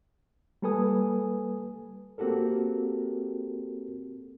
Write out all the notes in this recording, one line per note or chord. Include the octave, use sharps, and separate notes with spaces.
G3 A#3 A4 B4 G#5 D#6
A#3 C4 F#4 G4 A4 A#4